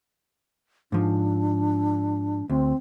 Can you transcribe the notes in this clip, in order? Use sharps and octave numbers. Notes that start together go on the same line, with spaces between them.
G#2 F3 D4
D2 C4